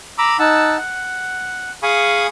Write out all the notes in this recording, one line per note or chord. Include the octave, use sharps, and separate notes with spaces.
A#5 B5 D6 E6
D#4 F#5 A5 E6
F#5
G#4 F5 G#5 B5 C#6 D#6